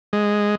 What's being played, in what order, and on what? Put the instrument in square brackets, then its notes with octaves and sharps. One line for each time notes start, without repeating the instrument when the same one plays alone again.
[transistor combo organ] G#3